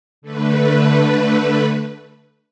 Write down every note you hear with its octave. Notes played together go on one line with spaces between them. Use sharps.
D3 A3 B4